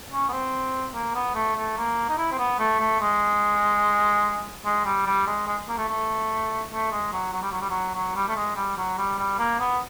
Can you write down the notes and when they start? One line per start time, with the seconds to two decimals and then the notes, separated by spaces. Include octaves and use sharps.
0.12 C#4
0.28 B3
0.33 C4
0.94 A#3
1.15 B3
1.35 A3
1.55 A3
1.77 A#3
2.09 D#4
2.18 E4
2.31 C4
2.39 B3
2.59 A3
2.79 A3
3.00 G#3
4.65 G#3
4.85 G3
5.06 G3
5.26 G#3
5.47 G#3
5.68 A#3
5.78 A3
5.88 A3
6.71 A3
6.92 G#3
7.12 F#3
7.33 F#3
7.42 G3
7.52 F#3
7.61 G3
7.70 F#3
7.94 F#3
8.15 G3
8.28 A3
8.36 G#3
8.56 G3
8.77 F#3
8.98 G3
9.18 G3
9.38 A#3
9.59 B3